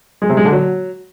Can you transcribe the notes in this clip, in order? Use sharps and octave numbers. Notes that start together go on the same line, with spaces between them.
G#3
C3
G#3
D3
F#3